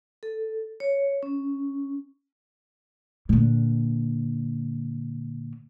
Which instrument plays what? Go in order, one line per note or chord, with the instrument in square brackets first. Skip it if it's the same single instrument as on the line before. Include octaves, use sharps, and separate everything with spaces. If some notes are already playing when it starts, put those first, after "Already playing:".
[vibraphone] A4
C#5
C#4
[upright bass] A#2 D3